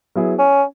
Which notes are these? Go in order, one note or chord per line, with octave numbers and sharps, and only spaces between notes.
F#3 B3 E4 G#4
C#4